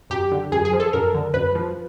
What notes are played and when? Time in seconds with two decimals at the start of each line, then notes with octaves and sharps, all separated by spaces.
0.10 F#2 G4
0.32 D3
0.52 F#2 G#4
0.65 G#4
0.73 F3
0.80 A4
0.93 F#2 A#4
1.14 D3
1.34 F#2 B4
1.55 F3